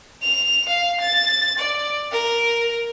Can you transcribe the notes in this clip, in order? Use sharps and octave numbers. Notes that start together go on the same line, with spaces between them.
F7
F5
A6
D5
A#4